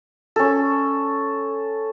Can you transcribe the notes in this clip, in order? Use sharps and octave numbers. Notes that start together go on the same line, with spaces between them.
C#4 A4